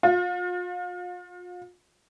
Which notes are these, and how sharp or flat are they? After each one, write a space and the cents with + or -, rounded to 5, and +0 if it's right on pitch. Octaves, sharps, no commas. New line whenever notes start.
F4 +35